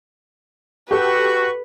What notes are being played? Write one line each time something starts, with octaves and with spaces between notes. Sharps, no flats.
F#4 G4 A4 B4 C#6